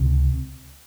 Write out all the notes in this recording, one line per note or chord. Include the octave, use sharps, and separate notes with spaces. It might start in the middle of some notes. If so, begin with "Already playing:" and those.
Already playing: C#2 C3 C4